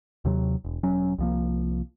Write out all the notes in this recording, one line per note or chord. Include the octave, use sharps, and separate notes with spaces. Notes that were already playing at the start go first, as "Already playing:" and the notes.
D#2 C3 F#3
E1
E1 F#3 C#4
C2 F3 A#3